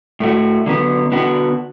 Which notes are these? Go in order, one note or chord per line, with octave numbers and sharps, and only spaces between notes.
A2 A3 F#4
D3 F#3 B3
D3 B3 F#4